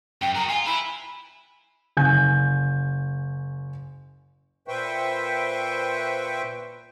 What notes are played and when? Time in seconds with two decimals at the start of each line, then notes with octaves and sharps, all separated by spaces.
0.22 F#2 G5
0.35 F#4 G#4 A#5
0.49 F4 G#5
0.66 E4 B5
1.97 F#1 G#5 G6
4.68 A#2 B4 C5 E5 G5 C#6